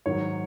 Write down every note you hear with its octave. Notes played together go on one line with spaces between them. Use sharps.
G#2 D#3 F#3 C#5